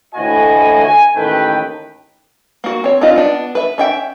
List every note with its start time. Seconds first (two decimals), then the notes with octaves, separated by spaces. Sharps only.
0.15 D2 A2 E3 F#4 D#5 G#5
0.84 G#5
1.15 A1 D#2 D#3 A3 B4 G5
2.64 A#3 F#4
2.84 C4 C#5
3.01 C4 D4 D#4 F4 D#5
3.16 B3 D4
3.55 B4 E5
3.78 C#4 E5 G5